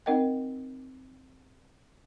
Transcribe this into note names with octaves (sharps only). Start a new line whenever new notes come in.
C4 D#4 A#4 D#5 F#5 G5